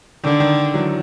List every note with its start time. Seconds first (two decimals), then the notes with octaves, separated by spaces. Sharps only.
0.23 D3 D#3
0.40 D#3
0.74 E3 F#3